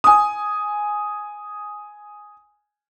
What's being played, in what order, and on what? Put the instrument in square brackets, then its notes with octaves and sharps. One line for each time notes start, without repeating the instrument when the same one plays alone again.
[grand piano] G#5 D#6